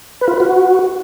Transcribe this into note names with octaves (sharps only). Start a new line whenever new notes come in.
B4
F4
B4
F#4